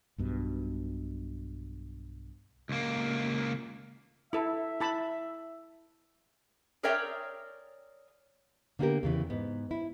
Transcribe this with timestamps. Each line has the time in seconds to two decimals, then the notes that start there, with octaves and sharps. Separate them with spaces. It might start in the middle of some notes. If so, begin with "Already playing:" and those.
0.18 B1 G2 B2
2.69 C#2 A#3
4.33 E4 A4 E5
4.80 E4 A5 B5
6.83 G#4 A#4 C#5 D5 E5 G5
8.79 D3 A#3 B3 F4 G4 A#4
9.03 E2 C#3 E3
9.30 G#2 B3
9.71 E4